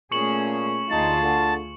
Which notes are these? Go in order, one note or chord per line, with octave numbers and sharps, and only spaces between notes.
A#2 A3 C#4 G#4 C#6 C#7 F#7
D2 D#4 F4 G#4 A5
D3